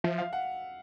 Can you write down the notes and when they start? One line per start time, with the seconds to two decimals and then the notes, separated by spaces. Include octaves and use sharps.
0.04 F3 E5
0.18 F5
0.33 F#5